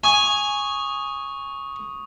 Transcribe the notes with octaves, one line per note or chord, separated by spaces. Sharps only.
G#5 C#6 D#6